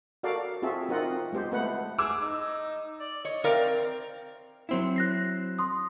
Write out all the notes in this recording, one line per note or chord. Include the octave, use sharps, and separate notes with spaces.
F#4 A4 A#4 D5 F5
C4 F4 F#4 G#4 A4 E5
C4 D#4 F4 A#4 D#5 F#5
G#3 B3 G4 C5
A3 B3 B4 F#5
G#4 D6 E6
D#4
D5
C#5 D#5
C4 A#4 D5 F5
F#3 C4 E4
F#6 A#6 C7
C6 D#6